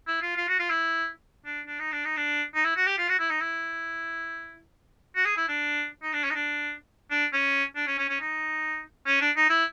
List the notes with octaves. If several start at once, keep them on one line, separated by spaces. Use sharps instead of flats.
E4
F4
F4
F#4
F4
E4
D4
D4
D#4
D4
D#4
D4
D#4
E4
F#4
G4
F4
F#4
E4
D#4
E4
F#4
G#4
E4
D4
D#4
D4
C#4
D#4
D4
D4
C#4
D4
C#4
C#4
C#4
D#4
C#4
D4
D#4
E4